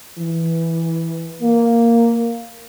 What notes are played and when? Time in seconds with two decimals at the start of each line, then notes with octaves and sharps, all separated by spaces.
0.18 E3
1.41 A#3